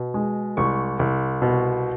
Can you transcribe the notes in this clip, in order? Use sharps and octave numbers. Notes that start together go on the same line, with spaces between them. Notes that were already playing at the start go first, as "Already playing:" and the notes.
Already playing: B2
G#3
C2 C#6
C2
B2